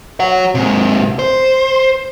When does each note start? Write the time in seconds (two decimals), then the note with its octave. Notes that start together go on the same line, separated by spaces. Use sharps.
0.20 C#5 F#5
0.55 G#2 C3
1.19 C5